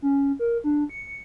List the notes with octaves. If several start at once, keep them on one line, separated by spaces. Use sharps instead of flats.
C#4
A#4
D4
C#7